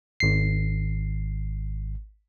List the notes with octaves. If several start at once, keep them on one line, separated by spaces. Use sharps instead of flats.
G#1 C7